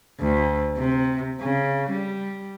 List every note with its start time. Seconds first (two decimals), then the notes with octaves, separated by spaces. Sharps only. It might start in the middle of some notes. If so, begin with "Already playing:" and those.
0.18 D2
0.75 C3
1.40 C#3
1.90 G3